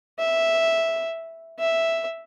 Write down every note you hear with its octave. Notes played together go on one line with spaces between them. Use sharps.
E5
E5